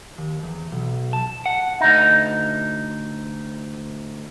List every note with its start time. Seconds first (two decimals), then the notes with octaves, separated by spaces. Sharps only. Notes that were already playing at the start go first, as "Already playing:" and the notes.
0.18 D#2
0.43 E2
0.72 B1
1.13 A5
1.46 F#5
1.81 D2 D#4